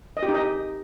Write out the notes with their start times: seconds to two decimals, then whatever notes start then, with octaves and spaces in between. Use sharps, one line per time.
0.17 D#5
0.23 G4
0.29 D#4
0.34 D#5